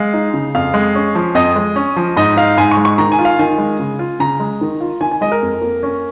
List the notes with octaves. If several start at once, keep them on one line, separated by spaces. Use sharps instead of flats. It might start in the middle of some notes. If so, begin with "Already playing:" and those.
Already playing: G#3 F5
D#4
C#3
F2 F5
G#3
C#4
F3
F2 D#5
G#3
C#4
F3
G#2 D#5
D#4 F5
G#2 G#5
C#6
G#3
C#6
D#3 A#5
G#5
F4
F5
D#3 G#5
G#3
C#3
F4
C#3 A#5
G#3
D#3
F4
D#3 G#5
G#5
G#3 D#5
A#4
F2
A#3
C#4